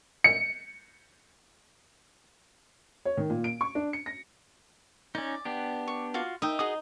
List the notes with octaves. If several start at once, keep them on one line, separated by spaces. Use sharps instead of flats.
C#7
C#5
D#3
A#2
D7
C#6
D4
C#7
A#6
C#4 D#4 D5
B3 D4 G4
C#6
F4 F#4 F5
D#4 E5 G5
F#4 G#4 D#5 D#6